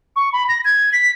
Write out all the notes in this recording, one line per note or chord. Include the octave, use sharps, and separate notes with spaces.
C#6
B5
A#6
G#6
B6